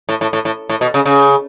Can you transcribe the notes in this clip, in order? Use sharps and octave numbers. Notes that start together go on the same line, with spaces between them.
A2
A2
A2
A2
A2
B2
C#3
C#3